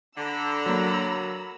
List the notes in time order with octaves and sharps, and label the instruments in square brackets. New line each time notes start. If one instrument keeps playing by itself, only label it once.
[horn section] D3 [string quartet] A#5 B5 E6
[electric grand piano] F#3 A#3